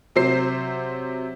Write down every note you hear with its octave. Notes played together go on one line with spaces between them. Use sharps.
C3 F#3 C5 C7